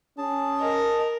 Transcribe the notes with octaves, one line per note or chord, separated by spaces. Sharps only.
C#4 G#4 A5
A#4 D#5